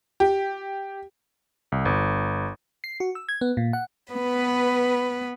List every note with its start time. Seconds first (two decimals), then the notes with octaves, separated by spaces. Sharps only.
0.20 G4
1.72 C2
1.85 G1
2.84 C7
3.00 F#4
3.15 E6
3.29 G#6
3.41 B3
3.57 A#2
3.73 F#5
4.13 B3 B4